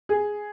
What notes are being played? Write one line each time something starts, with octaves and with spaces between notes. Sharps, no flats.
G#4